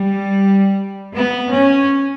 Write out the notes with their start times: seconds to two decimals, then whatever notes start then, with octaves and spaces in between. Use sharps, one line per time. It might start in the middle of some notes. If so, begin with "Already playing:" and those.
Already playing: G3
1.14 B3
1.51 C#4